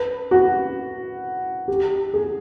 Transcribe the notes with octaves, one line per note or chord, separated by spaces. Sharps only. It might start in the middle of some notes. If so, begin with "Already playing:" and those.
Already playing: B4
F#4
G4
G#4